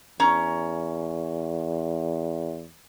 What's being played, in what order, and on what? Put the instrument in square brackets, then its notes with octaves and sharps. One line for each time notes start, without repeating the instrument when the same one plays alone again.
[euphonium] E2 [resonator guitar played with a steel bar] C#4 A#5